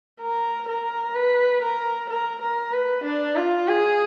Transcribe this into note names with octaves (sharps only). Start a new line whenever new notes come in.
A#4
A#4
B4
A#4
A#4
A#4
B4
D4
F4
G#4